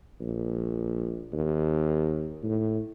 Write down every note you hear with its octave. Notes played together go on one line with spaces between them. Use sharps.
A#1
D#2
A2